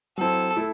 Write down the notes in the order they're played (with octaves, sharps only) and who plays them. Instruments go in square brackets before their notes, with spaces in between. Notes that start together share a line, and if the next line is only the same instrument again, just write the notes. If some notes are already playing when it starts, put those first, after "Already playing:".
[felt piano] F#3 C4 E4 [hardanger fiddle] A4
[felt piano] A3 E4